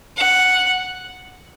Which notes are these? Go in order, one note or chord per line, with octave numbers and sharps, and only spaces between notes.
F#5